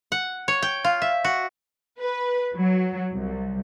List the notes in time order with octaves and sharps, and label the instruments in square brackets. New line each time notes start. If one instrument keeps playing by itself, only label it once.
[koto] F#5
C#5
G5
F4
E5
F#4
[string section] B4
F#3
C2